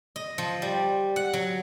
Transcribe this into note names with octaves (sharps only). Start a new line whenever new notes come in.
D#5
F3
G3
F#5
F#3